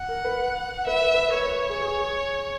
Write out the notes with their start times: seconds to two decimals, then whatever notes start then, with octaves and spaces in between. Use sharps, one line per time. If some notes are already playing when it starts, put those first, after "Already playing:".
Already playing: F#5
0.09 A#4
0.24 B4
0.87 B4 E5
1.14 B4
1.34 B4 C#5
1.46 B4
1.69 G#4
1.81 G#4